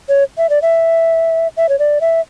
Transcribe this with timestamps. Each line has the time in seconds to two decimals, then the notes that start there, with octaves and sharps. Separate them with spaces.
0.09 C#5
0.38 E5
0.49 D5
0.62 E5
1.57 E5
1.69 C#5
1.79 D5
2.01 E5